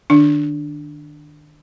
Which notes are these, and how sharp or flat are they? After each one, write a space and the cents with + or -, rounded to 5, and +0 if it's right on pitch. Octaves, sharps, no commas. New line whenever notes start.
D#3 -35 D4 +0